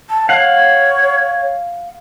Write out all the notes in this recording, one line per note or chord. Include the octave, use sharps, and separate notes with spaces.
A5
C#5 F5 F#5